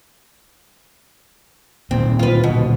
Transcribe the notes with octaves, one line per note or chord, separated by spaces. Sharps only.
D2 A#2 D#3 C4
F4 B4
B2